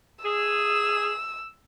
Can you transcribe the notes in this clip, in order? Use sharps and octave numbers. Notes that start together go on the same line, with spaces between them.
G#4 E6